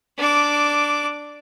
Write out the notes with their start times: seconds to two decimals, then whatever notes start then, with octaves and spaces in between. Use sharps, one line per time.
0.18 D4 D6